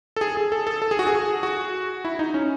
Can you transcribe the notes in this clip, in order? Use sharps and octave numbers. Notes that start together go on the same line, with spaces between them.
A4
G#4
G#4
A4
A4
A4
G#4
F#4
G#4
F#4
E4
D#4
C#4